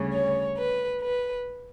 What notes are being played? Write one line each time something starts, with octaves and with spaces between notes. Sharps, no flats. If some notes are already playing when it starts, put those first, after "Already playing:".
Already playing: D2 C#3 G3 C#4
C#5
B4
B4